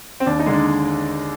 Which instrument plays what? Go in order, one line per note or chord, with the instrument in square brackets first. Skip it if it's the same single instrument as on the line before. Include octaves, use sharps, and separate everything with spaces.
[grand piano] C4
D#2 D4
D#4
D3 G#3
D4